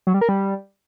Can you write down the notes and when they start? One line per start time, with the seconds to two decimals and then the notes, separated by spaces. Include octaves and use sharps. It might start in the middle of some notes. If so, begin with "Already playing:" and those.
0.07 F#3
0.14 G3
0.21 A#4
0.29 G3